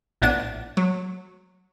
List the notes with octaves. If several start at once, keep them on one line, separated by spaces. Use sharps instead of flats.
A#1 A2 B3 D4 A5 D#7
F#3